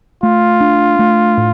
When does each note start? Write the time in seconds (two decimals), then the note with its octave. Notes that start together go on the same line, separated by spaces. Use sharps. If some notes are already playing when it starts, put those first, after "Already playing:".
0.23 A3 F4
0.60 D4
0.99 A3
1.37 A2